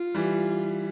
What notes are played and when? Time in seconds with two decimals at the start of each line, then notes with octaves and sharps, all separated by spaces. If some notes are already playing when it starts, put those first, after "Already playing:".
Already playing: F4
0.15 E3 G3